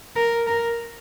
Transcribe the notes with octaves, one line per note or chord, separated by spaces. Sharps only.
A#4
A#4